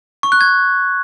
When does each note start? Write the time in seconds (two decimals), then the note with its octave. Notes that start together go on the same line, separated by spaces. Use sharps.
0.23 C#6
0.32 F#6
0.41 G#6